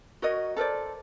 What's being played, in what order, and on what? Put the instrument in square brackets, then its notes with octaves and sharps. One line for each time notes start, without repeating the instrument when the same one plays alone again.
[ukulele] F#4 A#4 C#5 D#5
A4 A#4 C5 D5